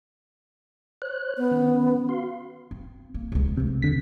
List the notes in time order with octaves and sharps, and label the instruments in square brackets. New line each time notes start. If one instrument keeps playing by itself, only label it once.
[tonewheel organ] C5 C#5 F#6
[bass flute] B3
[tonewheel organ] D#3 C#4
F#4 F5 C6
[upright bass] C4
A#3
E1 C#2
[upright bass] G2 A3 [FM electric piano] C3
[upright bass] E2 [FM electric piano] D3 B6